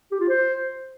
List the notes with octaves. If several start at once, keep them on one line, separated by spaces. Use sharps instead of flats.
G4
F4
C5